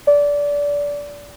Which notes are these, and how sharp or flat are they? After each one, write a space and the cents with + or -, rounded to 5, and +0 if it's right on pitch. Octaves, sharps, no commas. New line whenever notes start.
D5 -20